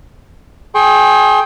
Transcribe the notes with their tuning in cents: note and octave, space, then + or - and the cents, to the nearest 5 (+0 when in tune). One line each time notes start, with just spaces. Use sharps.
G#4 +20 G5 +5 C6 +45